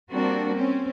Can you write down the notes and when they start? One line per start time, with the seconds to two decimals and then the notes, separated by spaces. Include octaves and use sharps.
0.12 G3 A#3 C4 D4 F#4
0.55 C4 C#4